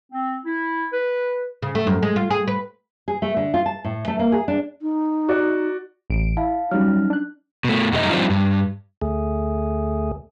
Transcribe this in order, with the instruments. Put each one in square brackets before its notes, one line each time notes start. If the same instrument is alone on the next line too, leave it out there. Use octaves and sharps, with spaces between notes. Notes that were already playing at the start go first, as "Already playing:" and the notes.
[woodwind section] C4
E4
B4
[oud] C#3
A3
F#2
G#3
F4
G#4
B4
[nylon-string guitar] G#4
A3
D3
F4
A5
A2
A3
A#3
G#4
D4
[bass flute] D#4
[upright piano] F#4 D5
[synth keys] A1 D7
[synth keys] E4 [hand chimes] F5 A5
[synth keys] F#3 G3 [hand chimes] C#4 D#4 F6
[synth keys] D4 F#6
[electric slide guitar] B2 A3
F#2 G3 A3 D#4 D#5
F3 G3 C4 D4 D#4 F4
G2
[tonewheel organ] D2 A3 G#4